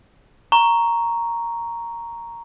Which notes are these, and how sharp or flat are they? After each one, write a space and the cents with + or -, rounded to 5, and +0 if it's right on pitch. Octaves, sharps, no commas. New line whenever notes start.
A#5 +0 C#6 +5